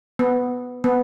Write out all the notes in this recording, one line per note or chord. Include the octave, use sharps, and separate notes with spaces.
B3
B3